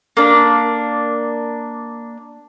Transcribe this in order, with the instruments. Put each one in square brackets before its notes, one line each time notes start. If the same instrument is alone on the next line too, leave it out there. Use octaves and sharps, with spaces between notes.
[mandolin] A#3 D4